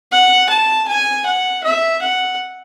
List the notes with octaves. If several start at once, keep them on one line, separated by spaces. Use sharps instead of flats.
F#5
A5
G#5
F#5
E5
F#5